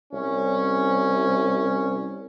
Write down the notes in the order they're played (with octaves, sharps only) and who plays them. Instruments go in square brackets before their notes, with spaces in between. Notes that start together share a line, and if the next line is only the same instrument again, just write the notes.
[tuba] C2 [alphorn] C#4